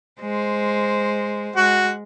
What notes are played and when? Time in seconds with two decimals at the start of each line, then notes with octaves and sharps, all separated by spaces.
0.21 G#3 C5
1.56 G#3 F#4